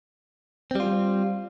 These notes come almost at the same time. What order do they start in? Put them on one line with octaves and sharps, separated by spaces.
C4 G3 F4